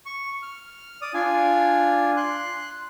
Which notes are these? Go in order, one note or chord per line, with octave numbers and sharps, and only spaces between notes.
C#6
F6
D5 D#6
D4 F4 G#5
C6 F#6